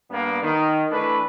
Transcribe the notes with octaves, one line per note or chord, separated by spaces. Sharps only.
G2 A#3 B3
D#3
E3 A3 D4 B4